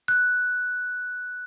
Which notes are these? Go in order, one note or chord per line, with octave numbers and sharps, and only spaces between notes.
F#6